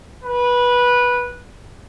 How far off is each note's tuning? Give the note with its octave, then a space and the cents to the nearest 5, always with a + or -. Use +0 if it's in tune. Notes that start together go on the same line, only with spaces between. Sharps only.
B4 -15